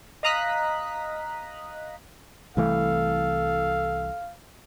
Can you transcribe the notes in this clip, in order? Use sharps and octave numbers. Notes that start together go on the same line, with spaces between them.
D#5 F5 A#5 D#6 F#6 B6
C2 E3 A3 A4 F5